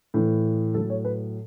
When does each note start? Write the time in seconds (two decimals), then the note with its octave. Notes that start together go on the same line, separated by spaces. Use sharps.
0.14 A2 E3
0.74 A2 F#3 A4
0.90 C#5
1.05 B4